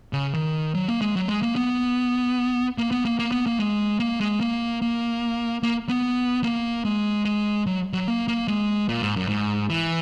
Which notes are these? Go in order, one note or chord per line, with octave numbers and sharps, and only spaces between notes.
C#3
D#3
F#3
A#3
G#3
F#3
G#3
A#3
B3
A#3
B3
A#3
A#3
B3
A#3
G#3
A#3
G#3
A#3
A#3
A#3
B3
A#3
G#3
G#3
F#3
F#3
A#3
A#3
G#3
A#2
G#2
F#2
G#2
E3